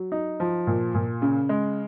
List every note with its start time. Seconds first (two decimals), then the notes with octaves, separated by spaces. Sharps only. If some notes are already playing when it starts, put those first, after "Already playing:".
Already playing: F#3
0.12 D#4
0.40 F3
0.67 A#2
0.94 A#2
1.22 C#3
1.49 G#3